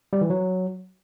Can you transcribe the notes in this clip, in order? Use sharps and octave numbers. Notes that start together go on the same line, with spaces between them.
G3
E3
F#3